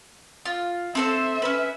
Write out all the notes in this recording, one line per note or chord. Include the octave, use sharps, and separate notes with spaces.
F4
C4 A4 C5 E5
C#4 B4